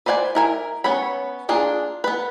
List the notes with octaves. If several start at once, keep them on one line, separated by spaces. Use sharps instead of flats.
B4 C5 D5 F#5 G#5
E4 A#4 G#5
B3 C#4 C#5 B5
A#3 D4 F4 G#4
B3 B4